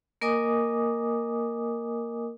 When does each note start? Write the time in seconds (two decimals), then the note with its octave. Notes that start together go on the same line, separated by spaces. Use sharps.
0.21 A#3 A#4 D#5 G#5 D6 D#6